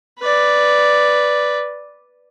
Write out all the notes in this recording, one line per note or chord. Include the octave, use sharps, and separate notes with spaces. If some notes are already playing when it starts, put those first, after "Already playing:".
B4 D5